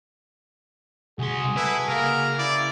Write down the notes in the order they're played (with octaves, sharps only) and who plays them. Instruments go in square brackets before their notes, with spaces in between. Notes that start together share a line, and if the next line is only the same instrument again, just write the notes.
[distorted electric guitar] C2 C6 [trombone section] F#4 G#4
[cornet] E4 [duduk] A4 [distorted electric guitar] B4
[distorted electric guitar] C#3 [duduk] A#3 [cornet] A#4
[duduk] E4 [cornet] D5